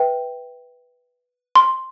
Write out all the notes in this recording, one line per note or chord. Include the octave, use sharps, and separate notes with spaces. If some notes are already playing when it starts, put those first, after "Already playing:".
Already playing: B4 E5 G5
C6